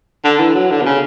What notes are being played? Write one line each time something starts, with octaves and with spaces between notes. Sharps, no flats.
D3
E3
F#3
D3
B2
C#3